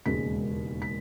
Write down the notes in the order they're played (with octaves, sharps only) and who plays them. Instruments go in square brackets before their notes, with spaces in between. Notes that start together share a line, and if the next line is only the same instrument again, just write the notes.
[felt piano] E1 D#2 C#3 G#3 C#4 B6
B6